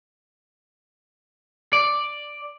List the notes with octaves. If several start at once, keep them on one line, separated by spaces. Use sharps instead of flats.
D5